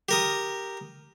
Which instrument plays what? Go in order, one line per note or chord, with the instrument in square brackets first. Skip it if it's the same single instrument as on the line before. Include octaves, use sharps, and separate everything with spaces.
[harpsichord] G4 A#4 D#6